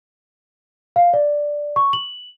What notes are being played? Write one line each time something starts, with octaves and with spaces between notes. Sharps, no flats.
F5
D5
C#6
F#7